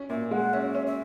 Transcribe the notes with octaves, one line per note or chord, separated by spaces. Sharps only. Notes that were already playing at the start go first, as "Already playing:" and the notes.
Already playing: C#4
A#2 E5
G#3 F#5
C#4 E5
C#4
E5